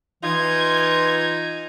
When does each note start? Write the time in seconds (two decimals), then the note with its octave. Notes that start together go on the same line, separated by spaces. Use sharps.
0.23 E3 D#4 F4 G#6